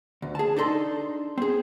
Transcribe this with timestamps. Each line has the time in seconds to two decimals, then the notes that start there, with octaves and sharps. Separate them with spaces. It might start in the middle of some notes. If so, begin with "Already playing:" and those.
0.22 D2
0.35 G#4 A5
0.56 D4 D#4 A4 C6
1.38 C4 G#4